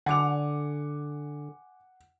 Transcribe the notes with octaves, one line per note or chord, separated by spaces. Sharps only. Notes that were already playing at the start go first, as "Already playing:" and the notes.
D3 F#5 G#5 D6 F7